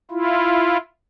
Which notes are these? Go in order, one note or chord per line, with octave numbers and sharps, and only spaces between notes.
E4 F4